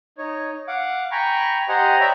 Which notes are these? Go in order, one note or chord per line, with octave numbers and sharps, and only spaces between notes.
D#4 C#5
F5 F#5 D6
G5 G#5 A#5 B5 C#6
G4 C5 D#5 F#5 G#5 A#5
C#5 D5 E5 G5 A#5 B5